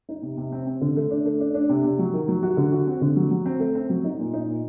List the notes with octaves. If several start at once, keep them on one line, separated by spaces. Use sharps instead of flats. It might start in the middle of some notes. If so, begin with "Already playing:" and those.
D#4
C3
C3
C4
C4
D3
A3
D4
A3
D4
D4
C3
C3
F#3
D#3
F#3
F#4
D3
F#4
C4
D3
F#3
F#3
C4
A3
C4
F#3
D#4
A#2
D#4
A#2